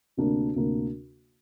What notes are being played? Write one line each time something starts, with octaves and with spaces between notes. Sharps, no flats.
D2 C3 A#3 D4 A#4
D2 C3 A#3 D4 A#4